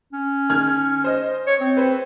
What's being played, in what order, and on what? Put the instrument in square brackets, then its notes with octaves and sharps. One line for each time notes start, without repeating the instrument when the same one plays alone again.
[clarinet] C#4
[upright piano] D#3 F6 G#6
C5 D#5
[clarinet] C#5
C4
[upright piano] B4 C5